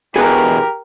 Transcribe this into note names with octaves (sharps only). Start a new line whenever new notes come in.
E2 B2 G4 G#4 A#4 B4